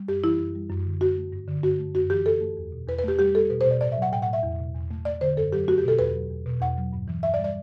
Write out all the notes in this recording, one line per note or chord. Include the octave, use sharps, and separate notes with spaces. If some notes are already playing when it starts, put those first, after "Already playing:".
Already playing: G3
F#2 G4
E3 E4
F#2
G3
F#2
D3
F#2 F#4
A3
G2
D3
G2 F#4
A3
F#2 F#4
E3 G4
F#2 A4
A3
E2
B2
E2 B4
B4
A3 G4
G3 G4
G3 A4
B2 B4
C5
B2
D5
A2 D5
E5
F#3
F#5
A2 G5
F#5
A3 E5
E2
B2
E2
A3
A3 D5
D3 C5
F#2 A4
F#3 G4
A3 F#4
G4
B2 A4
E2 B4
F#3
E2
B2
E2 F#5
F#3
G2
E3
G2 E5
D5
G3
D5